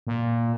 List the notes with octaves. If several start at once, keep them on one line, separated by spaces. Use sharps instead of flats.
A#2